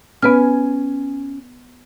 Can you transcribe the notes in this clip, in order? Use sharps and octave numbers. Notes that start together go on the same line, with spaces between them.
B3 C#4 B4 G#5 F6